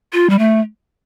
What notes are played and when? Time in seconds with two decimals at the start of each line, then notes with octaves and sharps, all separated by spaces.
0.13 F4
0.30 G3
0.39 A3